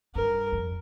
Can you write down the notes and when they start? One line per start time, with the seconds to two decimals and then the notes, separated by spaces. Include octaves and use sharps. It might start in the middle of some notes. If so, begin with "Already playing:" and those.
0.15 G2 A#4
0.52 F2